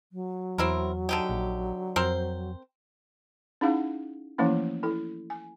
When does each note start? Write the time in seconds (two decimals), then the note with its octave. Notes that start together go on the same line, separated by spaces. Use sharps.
0.12 F#3
0.58 E2 C4 E4 A#4
1.09 D3 D#4 G4
1.29 A#1
1.96 F2 C4 A#4 C5
3.61 C#4 D#4 E4 G#4 F5 F#5
4.38 E3 F3 A3 A#3 C#4 E4
4.83 E4 A4
5.30 G#5